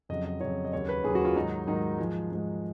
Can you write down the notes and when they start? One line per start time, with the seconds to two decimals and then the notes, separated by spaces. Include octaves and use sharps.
0.09 F2 C#3 F#3 D#5
0.25 D#5
0.41 F2 C#3 F#3 C#5
0.65 D#5
0.72 D#2 C#3 F#3 C#5
0.89 B4
1.04 D#2 C#3 F#3 G#4
1.15 F#4
1.25 F4
1.36 G#2 D#3 F#3 D#4
1.67 G#2 D#3 F#3 D#4
1.98 G#2 F3 G#3
2.31 G#2 F3 G#3